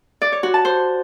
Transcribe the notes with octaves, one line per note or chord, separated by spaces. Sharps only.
D5
C#5
F#4
A5
C5